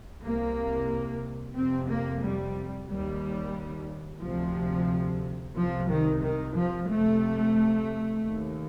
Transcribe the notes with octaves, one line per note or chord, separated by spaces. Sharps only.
C2 C3 A#3
F2 C3 C4
A#3
G3
D#2 G3
D2 C3 F3
C2 C3 F3
D#3
D#3
F3
F2 C3 A3
D#2